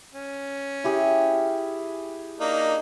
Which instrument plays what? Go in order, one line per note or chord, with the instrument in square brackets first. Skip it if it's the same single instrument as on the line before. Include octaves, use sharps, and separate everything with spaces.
[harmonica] C#4
[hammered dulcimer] E4 G4 G#4
[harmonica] A#3 D4 D#4